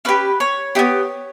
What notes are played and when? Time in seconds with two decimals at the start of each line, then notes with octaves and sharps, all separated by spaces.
0.05 C#4 G4 B4
0.40 C#5
0.75 B3 D#4 G4